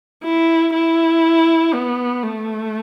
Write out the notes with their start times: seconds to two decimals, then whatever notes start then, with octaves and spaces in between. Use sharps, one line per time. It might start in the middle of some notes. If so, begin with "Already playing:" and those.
0.24 E4
0.74 E4
1.74 B3
2.23 A3